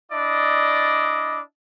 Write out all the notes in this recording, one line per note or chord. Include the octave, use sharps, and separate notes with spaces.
D4 E4 D5 D#5